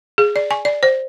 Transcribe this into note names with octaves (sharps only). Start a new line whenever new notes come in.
G#4
D5
G#5
D5
C5